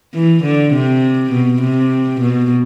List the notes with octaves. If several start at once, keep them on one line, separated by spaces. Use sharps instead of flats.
E3
D3
C3
B2
C3
B2